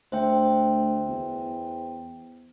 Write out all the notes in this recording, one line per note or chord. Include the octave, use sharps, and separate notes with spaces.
D2 C5 E5 G5
E2